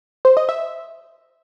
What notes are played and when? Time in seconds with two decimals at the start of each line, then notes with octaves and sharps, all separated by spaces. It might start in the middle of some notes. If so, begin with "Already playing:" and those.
0.25 C5
0.37 D#5
0.49 E5